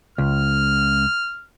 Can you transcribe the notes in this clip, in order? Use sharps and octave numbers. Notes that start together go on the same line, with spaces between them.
C#2 F6